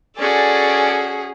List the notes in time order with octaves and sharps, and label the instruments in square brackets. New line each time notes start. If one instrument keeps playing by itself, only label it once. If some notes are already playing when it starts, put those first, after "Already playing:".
[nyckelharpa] C#4 F#4 [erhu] G#4 [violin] A4 D5